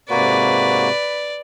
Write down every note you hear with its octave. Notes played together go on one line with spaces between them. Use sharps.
G#2 C3 A#3 F#4 B4 D5